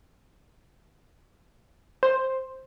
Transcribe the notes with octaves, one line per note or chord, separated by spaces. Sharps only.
C5